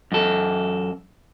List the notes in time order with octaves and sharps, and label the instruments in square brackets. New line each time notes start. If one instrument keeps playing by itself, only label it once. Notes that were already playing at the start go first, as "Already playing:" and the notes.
[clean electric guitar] F#2 A4